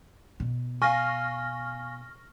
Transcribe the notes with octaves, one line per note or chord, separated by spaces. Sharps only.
B2
F5 G#5 C#6 F6 A#6